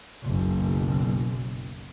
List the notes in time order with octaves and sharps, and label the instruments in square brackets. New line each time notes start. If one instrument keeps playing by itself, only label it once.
[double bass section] F#1 B1